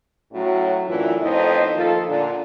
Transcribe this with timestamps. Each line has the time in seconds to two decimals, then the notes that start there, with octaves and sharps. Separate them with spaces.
0.33 A2 F#3 C#4 F#4
0.87 F#2 A2 E3 D4 E4 F4
1.21 F2 A2 B3 D#4 C5 D#5
1.74 D#2 F3 F4 A4
2.07 A#2 D3